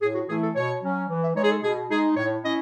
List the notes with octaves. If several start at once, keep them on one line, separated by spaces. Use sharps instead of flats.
A2 G#4
F#4
E3 A3 E4 G#4
A4
B2 C#5
F#3 C#4
E3
E5
G#3 D#4 C#5
G#4
A4
B2 G#4
G#3 D#4 G#4
A2 C#5
C#4 E4 D#5